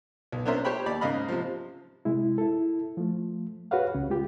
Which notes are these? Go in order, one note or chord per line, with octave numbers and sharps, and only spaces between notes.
B1
B3 C#4 D4 A#4 C5 E5
G4 C5 C#5 G5 B5
D#2 D5 B5
G#2 C#3 A#3 D#5 F5 B5
C3 F3
C3 G#3 E4
E4 A4
F3 A3
F#4 G#4 B4 C#5 F5 F#5
C#2 C#3
C#3 G#3 F4 G4